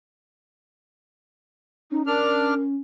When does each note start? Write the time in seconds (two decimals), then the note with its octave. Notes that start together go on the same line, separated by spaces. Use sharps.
1.91 C#4 D#4
2.07 D4 A#4 F6